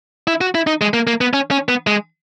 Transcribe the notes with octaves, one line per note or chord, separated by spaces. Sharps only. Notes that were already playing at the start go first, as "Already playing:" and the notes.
E4
F#4
E4
D#4
G#3
A#3
A#3
B3
C#4
C#4
B3
G#3